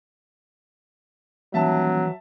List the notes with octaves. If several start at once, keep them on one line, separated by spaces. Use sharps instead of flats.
D#1 E3 F#3 E5 A5